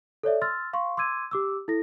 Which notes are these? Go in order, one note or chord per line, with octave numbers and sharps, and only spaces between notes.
A4 C#5 D5 E5
C6 E6 F6 A6
F5 C6 C#6
C6 D6 E6 G#6 D#7
G4 D6 E6
E4 A4 A#6